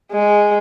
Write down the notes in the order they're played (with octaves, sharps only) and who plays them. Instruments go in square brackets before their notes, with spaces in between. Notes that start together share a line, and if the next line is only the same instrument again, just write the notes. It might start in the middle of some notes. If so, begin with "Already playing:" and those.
[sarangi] G#3